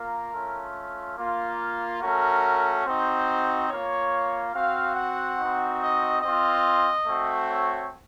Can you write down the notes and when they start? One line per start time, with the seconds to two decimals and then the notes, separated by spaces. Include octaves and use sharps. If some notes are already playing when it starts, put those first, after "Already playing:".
Already playing: A#3 F4 A#4
0.33 A3 C#4 F4
1.17 A#3 F4
2.01 A3 C#4 F#4 A#4
2.86 C4 D#4 F#4 C5
3.70 A#3 F4 C#5
4.54 C4 F#4 F5
4.96 F#5
5.39 C4 D#4 F#4
5.81 D#5
6.22 C4 F4 D#5
7.07 A3 C4 F#4
7.48 C#5